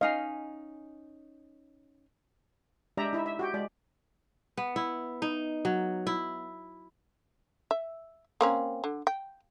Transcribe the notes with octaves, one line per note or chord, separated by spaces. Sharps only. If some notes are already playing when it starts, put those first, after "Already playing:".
C#4 D#4 D#5 F5 G#5
G#3 D4 G4 D5 E5 A#5
D#4 E4 E5
E5
F#4 G4 G5
G#3 D5
B3
E4
D#4
F#3
E4
E5
A#3 C4 C#4
D3
G5